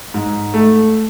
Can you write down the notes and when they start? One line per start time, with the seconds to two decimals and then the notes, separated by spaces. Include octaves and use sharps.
0.14 G#2
0.54 A3